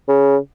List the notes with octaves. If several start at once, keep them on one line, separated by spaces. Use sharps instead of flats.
C#3